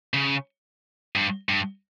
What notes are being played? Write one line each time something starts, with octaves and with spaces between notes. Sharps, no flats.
C#3
G2
G2